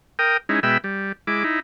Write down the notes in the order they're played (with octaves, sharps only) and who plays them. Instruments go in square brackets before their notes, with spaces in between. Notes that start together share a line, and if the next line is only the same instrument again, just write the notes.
[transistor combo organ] A#4 G5 D#6
G#3 C#4 D#4 E4
B2 G#3 E5 G5 B5 E6
G3
G#3 E4 D6
D#4 E4